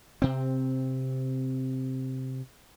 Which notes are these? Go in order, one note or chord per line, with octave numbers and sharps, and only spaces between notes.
C3 C4